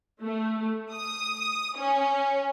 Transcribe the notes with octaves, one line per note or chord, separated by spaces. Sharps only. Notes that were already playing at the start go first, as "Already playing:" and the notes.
A3
D#6
C#4